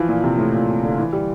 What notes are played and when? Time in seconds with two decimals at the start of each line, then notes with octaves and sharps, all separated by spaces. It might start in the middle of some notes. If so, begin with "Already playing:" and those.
Already playing: E3 F3
0.09 A#2
0.24 C3
0.38 A2
0.53 A#2
0.69 C3
0.83 D3
0.98 E3
1.13 G3